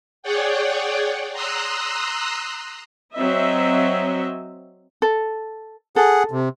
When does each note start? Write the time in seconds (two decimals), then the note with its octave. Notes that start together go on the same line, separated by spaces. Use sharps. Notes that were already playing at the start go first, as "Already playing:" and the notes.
0.23 G#4 C#5 D5 F#5 G5
1.32 A#5 C6 D#6 E6 F#6
3.15 F#3 C4 D#5 E5
5.02 A4
5.96 G#4 A4 F#5
6.31 C3